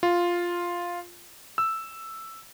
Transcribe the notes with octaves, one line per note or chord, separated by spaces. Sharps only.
F4
E6